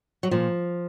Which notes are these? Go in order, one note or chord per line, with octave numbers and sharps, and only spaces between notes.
F#3
A#2 F3